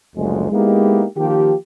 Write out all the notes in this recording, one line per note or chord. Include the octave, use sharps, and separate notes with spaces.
F#1 D2 F3 G#3
G#3 A#3 B3 D#4 E4 G4
D#3 F3 A#3 G4